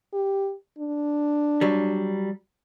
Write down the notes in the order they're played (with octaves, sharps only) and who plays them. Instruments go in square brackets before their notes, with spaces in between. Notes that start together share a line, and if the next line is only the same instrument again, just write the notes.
[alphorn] G4
D4
[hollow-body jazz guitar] F#3 G3